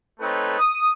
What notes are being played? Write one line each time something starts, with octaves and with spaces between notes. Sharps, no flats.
A3 C4 D#4 A4 B4 C#5
D#6